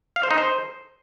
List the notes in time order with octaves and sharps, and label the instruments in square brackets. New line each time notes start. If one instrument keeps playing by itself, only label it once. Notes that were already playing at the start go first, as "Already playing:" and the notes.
[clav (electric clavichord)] F5
C5
D#4
C5